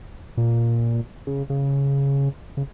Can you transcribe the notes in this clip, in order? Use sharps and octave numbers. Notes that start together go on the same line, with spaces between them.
A#2
C#3
C#3
C#3